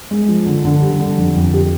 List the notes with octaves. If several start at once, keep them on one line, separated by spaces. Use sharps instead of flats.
G#3
F3
D3
D3
G3
D3
F2
F2
G4